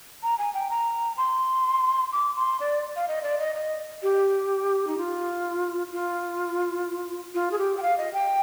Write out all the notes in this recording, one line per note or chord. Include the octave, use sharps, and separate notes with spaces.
A#5
G#5
G5
A#5
C6
D6
C6
D5
F5
D#5
D5
D#5
D#5
G4
D#4
F4
F4
F4
G#4
G4
G5
F5
D#5
G5